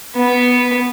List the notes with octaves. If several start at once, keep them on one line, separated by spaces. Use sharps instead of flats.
B3